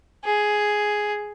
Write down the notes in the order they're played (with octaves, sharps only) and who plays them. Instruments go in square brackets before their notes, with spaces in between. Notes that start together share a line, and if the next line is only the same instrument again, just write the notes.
[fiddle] G#4